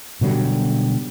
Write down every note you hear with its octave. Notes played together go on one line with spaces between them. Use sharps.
B2 D3 F#3 G3